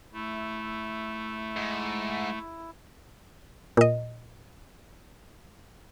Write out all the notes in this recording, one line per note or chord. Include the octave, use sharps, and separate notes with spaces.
A3 E4
G#2
A#2 D#5